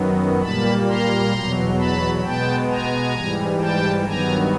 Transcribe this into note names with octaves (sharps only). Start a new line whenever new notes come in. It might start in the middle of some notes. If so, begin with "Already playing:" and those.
Already playing: F#2 D#3 F#3 B3
A#2 G3 A#3 A5 B5
A#5 C6
E2 B2 F#3
A5 B5
B2 G#3 B3 G5 A5
G#5 A#5
G#2 E3 G3
G5 A5
G2 D#3 F#3 B3 G#5 A#5